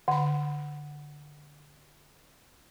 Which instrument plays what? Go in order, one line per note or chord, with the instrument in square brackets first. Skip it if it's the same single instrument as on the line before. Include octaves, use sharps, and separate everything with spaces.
[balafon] D3 B5 [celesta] F#5